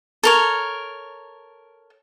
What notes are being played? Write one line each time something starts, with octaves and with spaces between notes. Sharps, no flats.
A4 A#4 C#5